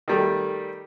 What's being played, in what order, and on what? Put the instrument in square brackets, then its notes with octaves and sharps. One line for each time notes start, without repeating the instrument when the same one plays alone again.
[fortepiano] D#3 G3 A3